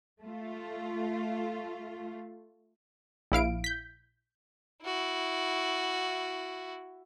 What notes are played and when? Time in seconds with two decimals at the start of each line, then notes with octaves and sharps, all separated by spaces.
0.22 A3 F4
3.32 A#1 E4 F5 D7
3.64 G6 B6
4.84 E4 F#4